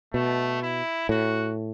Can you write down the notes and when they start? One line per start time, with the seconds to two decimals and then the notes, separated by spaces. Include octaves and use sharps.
0.14 B2 A3
0.62 E4
1.09 A2 F#4